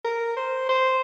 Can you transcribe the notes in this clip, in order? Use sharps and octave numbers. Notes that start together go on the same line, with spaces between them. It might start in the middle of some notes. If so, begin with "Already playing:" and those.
A#4
C5
C5